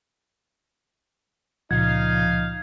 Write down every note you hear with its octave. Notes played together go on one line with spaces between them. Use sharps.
C#2 A#2 C#3 F3 D#4 F5 G#6